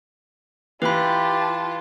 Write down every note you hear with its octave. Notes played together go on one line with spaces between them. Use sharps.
E3 F4 G4 B4 A5 B5